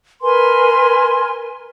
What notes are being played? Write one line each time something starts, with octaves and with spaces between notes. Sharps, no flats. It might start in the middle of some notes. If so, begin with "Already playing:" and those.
A#4 B4 G#5 C6